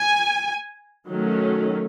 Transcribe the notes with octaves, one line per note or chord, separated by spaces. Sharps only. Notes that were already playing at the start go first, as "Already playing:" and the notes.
Already playing: G#5
D#3 F#3 A3 C#4